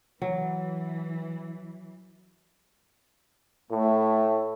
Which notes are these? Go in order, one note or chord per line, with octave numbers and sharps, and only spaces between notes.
E3 F#3
A2 A3